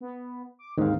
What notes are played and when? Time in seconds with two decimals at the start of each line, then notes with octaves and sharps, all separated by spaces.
0.01 B3
0.59 D6
0.78 D#2 G#2 D#3 C4 F5